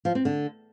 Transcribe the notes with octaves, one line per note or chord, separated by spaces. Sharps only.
F3
C4
D3